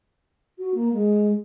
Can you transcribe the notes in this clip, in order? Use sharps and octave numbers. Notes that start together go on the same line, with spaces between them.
F#4
A#3
G#3